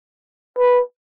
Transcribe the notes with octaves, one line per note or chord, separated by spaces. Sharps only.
B4